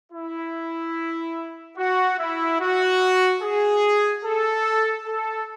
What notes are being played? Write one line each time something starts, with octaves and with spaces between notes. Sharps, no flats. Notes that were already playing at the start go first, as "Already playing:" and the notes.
E4
F#4
E4
F#4
G#4
A4
A4